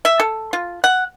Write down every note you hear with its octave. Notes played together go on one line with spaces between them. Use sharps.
E5
A4
F4
F#5